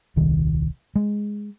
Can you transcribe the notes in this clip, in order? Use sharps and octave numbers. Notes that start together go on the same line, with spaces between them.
D#1 C2 D#3
G#3